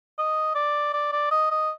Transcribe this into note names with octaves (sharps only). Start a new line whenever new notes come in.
D#5
D5
D5
D5
D#5
D#5